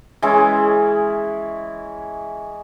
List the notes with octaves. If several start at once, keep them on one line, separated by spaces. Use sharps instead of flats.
E3 G#3 C#4 E4